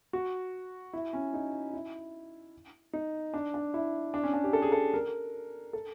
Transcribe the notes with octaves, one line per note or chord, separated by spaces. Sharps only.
F#4
E4
C#4
D#4
E4
D#4
D4
D4
E4
D4
C#4
D4
G4
A4
G#4
A4
A#4
A4